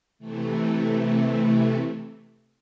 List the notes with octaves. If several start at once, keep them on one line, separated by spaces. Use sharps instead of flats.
C3 E3 A3